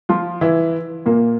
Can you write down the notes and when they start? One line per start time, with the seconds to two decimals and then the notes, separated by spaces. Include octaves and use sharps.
0.09 F3 F4
0.41 E3 E4
1.06 A#2 A#3